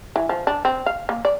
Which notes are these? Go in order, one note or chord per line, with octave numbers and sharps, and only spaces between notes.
E3
F3
D4
C4
F5
A#3
D5